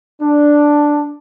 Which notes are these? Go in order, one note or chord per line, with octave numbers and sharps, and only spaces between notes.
D4